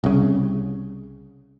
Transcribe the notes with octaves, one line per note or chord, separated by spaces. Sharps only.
C2 C#3